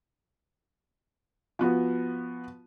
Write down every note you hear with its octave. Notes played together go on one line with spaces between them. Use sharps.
F3 B3 F#4